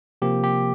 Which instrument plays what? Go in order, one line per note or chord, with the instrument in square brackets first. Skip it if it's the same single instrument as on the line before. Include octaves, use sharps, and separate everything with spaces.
[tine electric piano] C3 F3 A#3 G4
G4